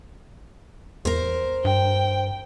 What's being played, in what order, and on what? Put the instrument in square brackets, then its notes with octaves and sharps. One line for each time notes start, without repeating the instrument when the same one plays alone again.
[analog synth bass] E2 [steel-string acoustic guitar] A#4 C5
[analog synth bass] G2 [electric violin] G5